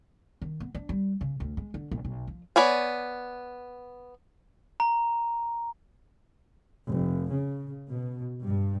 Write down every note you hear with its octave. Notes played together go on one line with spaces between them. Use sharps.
D#3
B3
D4
G3
C#3
D2
G#3
D3
A#1
B1
F3
B3 C#5 D5 G#5
A#5
F1
C#3
B2
G2